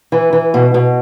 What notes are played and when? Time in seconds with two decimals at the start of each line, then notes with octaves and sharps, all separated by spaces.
0.12 E3
0.33 E3
0.54 B2
0.74 B2